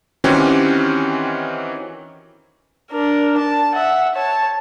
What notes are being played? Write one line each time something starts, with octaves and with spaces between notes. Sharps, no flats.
D#3 E3 C4 C#4 F#4 G4
D4 A#4
A5
E5 F#5
C#5 A5